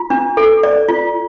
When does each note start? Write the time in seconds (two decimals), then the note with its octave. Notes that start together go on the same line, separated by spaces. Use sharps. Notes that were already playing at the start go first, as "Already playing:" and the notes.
Already playing: F4
0.10 D4
0.37 A4
0.63 D5
0.88 F4